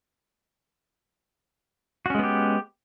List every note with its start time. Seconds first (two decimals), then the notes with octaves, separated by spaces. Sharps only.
2.06 F#4
2.10 C#4
2.15 G#3
2.19 B3
2.23 G4